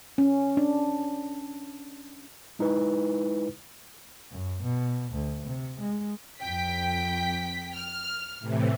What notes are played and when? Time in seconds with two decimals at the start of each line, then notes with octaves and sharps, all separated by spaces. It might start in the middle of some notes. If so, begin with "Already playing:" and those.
0.18 C#4
0.57 D4
2.59 G#3 D#4 E4 B4
4.31 F#2
4.63 B2
5.13 D2
5.46 C3
5.80 G#3
6.40 F2 G5 B6
7.74 F6
8.39 A2 C3 E3